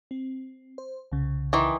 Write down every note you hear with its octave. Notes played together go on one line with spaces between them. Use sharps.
C4
C5
C2 C#3
D#3 E3